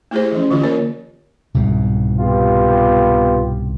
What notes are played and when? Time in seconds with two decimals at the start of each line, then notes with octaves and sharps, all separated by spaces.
0.11 A3 E4 G4 G#4 C5
0.32 E3 F3 C#4
0.51 D3 E3 F4 G4
0.63 A#3 A#4 C#5
1.54 C2 G#2 B2
2.20 B3 F4 G4